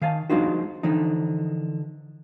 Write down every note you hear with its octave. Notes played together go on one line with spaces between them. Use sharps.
D#3 F5 G#5 A5
F3 G#3 D4 D#4 F4 F#4
D3 E3 F3 D#4